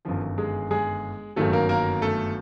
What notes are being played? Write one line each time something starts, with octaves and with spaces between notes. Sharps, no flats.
G1 F#2 D#3 F3 F4
G#3 G#4
G#3 G#4
G1 F#2 D#3 F#3 A3 A4
A#3 A#4
A#3 A#4
A3 A4